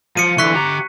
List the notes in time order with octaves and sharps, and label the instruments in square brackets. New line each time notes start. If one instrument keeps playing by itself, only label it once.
[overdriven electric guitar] F3 [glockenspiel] C#7 D#7
[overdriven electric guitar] D3 E3 [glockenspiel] C#6 F#6 B6
[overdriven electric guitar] G4 A#5